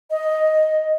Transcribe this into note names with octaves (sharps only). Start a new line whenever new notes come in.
D#5